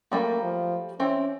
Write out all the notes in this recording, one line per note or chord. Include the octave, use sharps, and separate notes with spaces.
F#3 G3 A3 A#3
F3
E3 C4 C#4